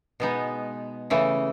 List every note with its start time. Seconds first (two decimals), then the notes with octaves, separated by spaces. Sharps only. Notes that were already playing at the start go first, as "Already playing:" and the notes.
0.20 B2 G#3 B3 D#4
1.10 C#3 E3 A3